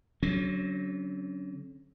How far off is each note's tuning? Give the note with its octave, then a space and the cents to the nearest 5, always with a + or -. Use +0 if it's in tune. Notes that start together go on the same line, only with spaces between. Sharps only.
D3 -40 F#3 +15 C#4 -45